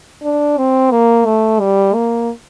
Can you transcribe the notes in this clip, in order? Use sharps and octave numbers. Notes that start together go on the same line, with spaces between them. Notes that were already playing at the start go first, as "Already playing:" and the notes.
D4
C4
A#3
A3
G3
A#3